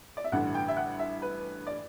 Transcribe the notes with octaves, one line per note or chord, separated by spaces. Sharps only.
D5
E5
A1 G2 D3 F#5
G5
E5
F#5
E5
B4
D5